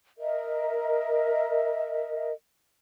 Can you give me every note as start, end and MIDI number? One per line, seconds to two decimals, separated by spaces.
0.18 2.32 70
0.18 2.32 75
0.18 2.32 76